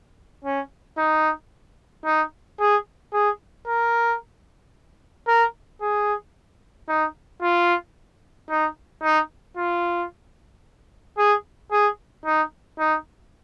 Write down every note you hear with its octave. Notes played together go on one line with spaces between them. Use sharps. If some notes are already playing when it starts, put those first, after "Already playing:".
C#4
D#4
D#4
G#4
G#4
A#4
A#4
G#4
D#4
F4
D#4
D#4
F4
G#4
G#4
D#4
D#4